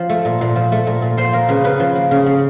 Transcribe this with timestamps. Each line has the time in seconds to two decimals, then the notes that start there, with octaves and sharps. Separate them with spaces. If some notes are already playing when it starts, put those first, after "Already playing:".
Already playing: F3
0.10 A3
0.25 A#2
0.41 A#2
0.56 F3
0.72 A3
0.87 A#2
1.02 A#2
1.17 F3 C5
1.33 A#3 A#4
1.49 C#3 B4
1.64 C#3 B4
1.80 F3
1.96 A#3
2.11 C#3
2.26 C#3